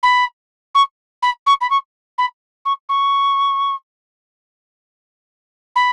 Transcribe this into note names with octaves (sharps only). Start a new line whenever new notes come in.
B5
C#6
B5
C#6
B5
C#6
B5
C#6
C#6
B5